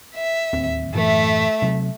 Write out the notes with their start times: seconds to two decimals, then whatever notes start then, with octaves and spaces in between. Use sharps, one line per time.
0.15 E5
0.53 D1 D#2 C4
0.95 F#2 A2 E3 A3 E5
1.62 C3 F#3